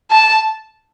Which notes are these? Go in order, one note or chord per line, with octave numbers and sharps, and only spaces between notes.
A5